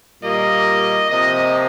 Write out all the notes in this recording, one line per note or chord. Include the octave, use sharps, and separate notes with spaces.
A#2 G3 A#3 D#5
C3 F3 A#3 D#5